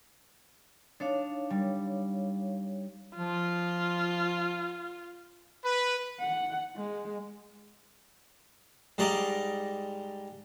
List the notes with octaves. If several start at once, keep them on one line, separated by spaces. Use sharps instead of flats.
D4 D#4 C#5 F5
G3
F3 F4
B4
F#5
G#3
G#2 G3 D5 D#5 A#5